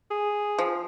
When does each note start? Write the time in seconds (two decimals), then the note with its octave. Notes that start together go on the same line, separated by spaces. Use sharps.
0.11 G#4
0.59 F3